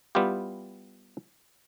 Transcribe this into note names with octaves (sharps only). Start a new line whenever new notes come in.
G3 B3 E4 F4 G4